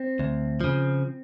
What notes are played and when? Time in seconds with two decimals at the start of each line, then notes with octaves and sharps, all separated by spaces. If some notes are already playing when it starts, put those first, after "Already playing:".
Already playing: C4
0.19 D2
0.61 C#3 F3